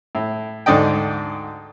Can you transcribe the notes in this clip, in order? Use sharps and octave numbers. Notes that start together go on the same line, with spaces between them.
A2
D2 G#2 D3 D5 D#5 G5